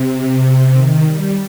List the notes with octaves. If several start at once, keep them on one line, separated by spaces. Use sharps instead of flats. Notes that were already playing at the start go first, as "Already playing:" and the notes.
Already playing: C3
D#3
G3